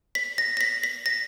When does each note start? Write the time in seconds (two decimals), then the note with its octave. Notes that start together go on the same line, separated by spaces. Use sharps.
0.15 B6
0.38 A#6
0.57 A#6
0.61 B6
0.83 B6
1.06 A#6